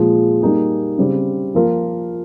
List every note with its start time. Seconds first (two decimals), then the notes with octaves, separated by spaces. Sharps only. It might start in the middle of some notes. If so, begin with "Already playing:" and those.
Already playing: A#2 F3 G#3
0.42 G3 A#3 D#4 G#4
0.98 C#3 G3 C4
1.55 F3 A#3 F4 A#4